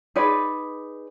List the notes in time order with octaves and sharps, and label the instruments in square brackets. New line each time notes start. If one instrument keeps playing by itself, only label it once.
[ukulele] D#4 G#4 B4 D5